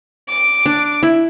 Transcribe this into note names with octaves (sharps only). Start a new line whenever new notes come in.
D6
D4
E4